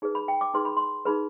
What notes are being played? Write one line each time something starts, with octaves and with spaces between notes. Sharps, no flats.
D#4 G#4 B4
B5
G5
D6
D#4 G#4 B4 C6
B5
C6
D#4 G#4 B4 B5